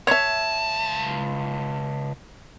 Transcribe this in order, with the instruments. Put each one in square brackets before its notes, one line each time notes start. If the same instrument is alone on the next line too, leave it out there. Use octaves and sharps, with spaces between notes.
[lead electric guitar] C#2 A5 [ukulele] C#5 E5